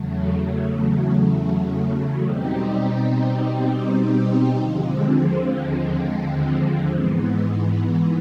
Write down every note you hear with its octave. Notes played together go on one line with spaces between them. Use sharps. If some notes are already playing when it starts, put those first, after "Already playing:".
Already playing: E2 C#3 F#3 A3
B2 G3 C4 D#4 G4
D#2 D3 F3 G#3 C4
G#2 E3 G#3 B3